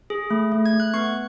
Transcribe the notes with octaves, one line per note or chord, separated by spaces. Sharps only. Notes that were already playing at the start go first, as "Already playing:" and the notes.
G#4
A3
A3
G#6
A3
F#6
B3 C#6